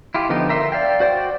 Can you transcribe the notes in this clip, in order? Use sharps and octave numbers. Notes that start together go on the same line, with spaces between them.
E4 F4 G4
D3 F3 B3 D#4 G4
A#4 E5 C6
D5 F5 G5
F#4 C5 D5 G5